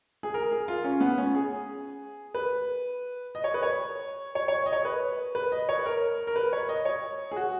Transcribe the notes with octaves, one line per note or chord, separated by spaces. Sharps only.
G#4
A#4
G#4
F4
C#4
B3
C#4
G#4
B4
D#5
C#5
B4
C#5
C#5
C#5
D#5
C#5
B4
B4
D#5
C#5
B4
A#4
A#4
B4
C#5
D#5
C#5
G#4
F#4